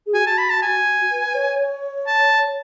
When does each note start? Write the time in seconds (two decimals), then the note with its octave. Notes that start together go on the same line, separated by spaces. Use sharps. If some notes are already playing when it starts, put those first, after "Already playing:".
0.06 G#4
0.14 F#4 G#5
0.26 A5
0.38 B5
0.50 A5
0.62 G#5
1.11 B4
1.35 C#5
1.59 C#5
2.07 A5